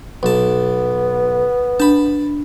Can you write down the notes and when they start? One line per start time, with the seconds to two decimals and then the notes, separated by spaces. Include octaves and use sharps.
0.23 B1 B3 A5
1.80 D4 A5 B5